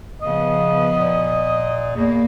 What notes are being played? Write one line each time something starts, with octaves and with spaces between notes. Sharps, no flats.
C#3 F3 B3 D#5
A#2
E2 A#3